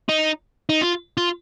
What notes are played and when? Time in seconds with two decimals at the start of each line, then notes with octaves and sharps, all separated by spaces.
0.09 D#4
0.69 D#4
0.81 F4
1.17 F4